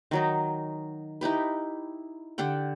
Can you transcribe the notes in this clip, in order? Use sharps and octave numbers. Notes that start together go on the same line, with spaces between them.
D#3 F#3 D#4
D#4 E4 G4 B4
D3 G4 F#5 G5